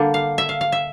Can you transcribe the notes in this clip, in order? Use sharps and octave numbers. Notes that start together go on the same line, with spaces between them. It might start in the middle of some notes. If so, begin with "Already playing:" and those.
Already playing: D3 G3 A#3 D4
F5
E5
F5
F5
E5